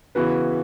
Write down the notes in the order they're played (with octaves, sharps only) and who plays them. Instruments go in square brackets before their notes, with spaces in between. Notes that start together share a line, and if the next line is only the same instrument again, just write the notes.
[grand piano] C#3 E3 B3 F#4 B4